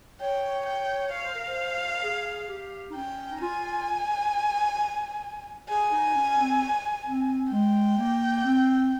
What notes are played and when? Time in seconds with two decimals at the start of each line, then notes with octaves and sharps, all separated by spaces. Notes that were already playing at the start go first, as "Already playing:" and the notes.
0.21 C#5 G5
0.66 G5
1.12 C#5 F5
1.23 C5
1.35 A#4
1.47 C5
1.97 A#4
2.03 G#4
2.49 G4
2.89 D#4
2.95 C#4 G5
3.30 D#4
3.41 F4 G#5
5.69 G#4 G#5
5.91 D#4
6.15 C#4
6.38 C4
7.07 C4
7.52 G#3 G5
7.98 A#3
8.44 C4